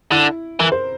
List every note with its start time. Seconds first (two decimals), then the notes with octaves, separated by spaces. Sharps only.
0.12 D3 E4
0.59 E3 A#4
0.72 C5